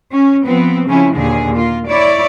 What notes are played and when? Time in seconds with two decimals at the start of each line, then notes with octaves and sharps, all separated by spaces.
0.12 C#4
0.45 F3 B3 C4
0.87 C#3 F3 C#4 E4
1.16 D#2 A#2 D3 G#4
1.55 A#3 F4
1.87 E4 C#5 D5